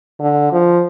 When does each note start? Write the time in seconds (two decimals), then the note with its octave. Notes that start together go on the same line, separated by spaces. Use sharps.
0.21 D3
0.52 F3